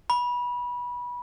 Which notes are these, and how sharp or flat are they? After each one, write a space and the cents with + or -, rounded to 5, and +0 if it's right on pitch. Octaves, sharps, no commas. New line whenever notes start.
B5 -20